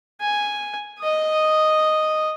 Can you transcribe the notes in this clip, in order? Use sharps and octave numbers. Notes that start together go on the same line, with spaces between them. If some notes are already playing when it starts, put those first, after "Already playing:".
G#5
D#5 D#6